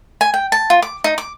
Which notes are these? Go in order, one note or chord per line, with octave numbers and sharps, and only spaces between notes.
G#5
G5
A5
F4
D6
D#4
D6